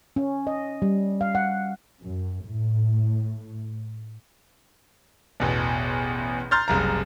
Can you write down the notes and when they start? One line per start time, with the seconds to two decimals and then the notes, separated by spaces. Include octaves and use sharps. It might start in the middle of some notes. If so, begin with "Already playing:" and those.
0.16 C#4
0.47 D#5
0.82 G3
1.21 F5
1.35 F#5
2.04 F#2
2.48 A2
5.40 A1 E2 B2
6.51 A#5 C6 F6 G6 A6
6.68 F#1 C2 A#5